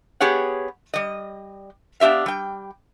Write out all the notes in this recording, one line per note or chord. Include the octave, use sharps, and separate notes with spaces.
B3 G4 G#4 C#5 F#5
G3 D#5
B3 D4 G4 E5 F5
G3 G5